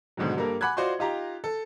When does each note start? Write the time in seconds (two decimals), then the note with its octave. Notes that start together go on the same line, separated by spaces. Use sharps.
0.17 G#2 B2 D3 D#3 F#3
0.37 G2 A#3 A4 A#4
0.61 F#5 G#5 B5 D6 F#6 G#6
0.77 F4 F#4 C5 D5 D#5 C6
0.99 D#4 F4 G4 A#5
1.44 A4